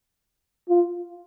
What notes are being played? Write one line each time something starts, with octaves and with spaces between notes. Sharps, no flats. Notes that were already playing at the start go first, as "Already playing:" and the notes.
F4